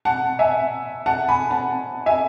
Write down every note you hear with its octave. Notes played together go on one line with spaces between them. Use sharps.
F#5 A5
E5 G#5
F#5 A5
G#5 B5
F#5 A5
E5 G#5